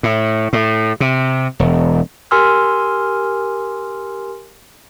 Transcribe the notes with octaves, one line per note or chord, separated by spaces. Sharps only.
A2
A2
C3
E1
G4 A#4 G#5 C6 E6 F6